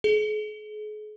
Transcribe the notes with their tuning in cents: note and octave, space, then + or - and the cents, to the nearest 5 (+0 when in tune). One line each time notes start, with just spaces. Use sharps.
G#4 +40